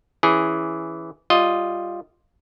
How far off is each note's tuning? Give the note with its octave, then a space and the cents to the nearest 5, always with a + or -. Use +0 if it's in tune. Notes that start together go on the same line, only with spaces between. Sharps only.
E3 +0 C#4 +0 G#4 +0
G3 +0 F4 +0 D#5 +0